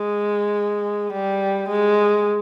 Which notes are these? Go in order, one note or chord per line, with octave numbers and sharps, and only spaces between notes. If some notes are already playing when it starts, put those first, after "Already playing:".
Already playing: G#3
G3
G#3